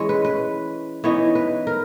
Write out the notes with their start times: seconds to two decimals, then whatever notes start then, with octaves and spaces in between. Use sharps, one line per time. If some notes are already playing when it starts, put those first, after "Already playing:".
Already playing: E3 G#3 C#4 E4 C#5
0.09 B4
0.25 B4
1.04 E3 B3 D#4 C#5
1.35 B4
1.67 A#4